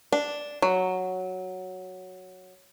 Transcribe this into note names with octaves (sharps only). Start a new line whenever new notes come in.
D4
F#3